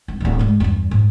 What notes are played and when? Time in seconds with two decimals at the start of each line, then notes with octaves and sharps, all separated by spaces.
0.08 C2
0.20 D1 D2
0.39 G#2 G#3
0.60 E2 G2
0.91 G#2